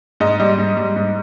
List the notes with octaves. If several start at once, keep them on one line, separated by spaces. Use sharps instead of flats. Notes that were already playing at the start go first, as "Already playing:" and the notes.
G#2 D#5
G3 D#5
G#2
G3
G#2